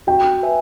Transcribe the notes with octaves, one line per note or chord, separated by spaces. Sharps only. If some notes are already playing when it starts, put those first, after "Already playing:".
F#4 G5
B4 E5 G#5